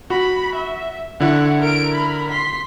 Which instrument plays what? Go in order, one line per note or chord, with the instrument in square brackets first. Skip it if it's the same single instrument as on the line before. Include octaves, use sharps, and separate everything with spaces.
[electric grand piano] F#4 [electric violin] B5
[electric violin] E5
[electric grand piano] D3 E4 [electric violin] F#5 C#6
[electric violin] A#4 D7
A#4 B5
C6 B6